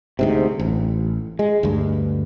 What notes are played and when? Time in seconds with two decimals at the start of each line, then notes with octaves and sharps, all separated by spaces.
0.19 D2 G#2 C3
0.60 A1
1.39 G#3
1.63 D2 G2